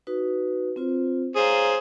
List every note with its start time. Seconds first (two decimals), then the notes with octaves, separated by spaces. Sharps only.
0.07 D#4 F#4 B4
0.76 C4 F4 C5
1.36 G#4 C5 C#5 F5 A#5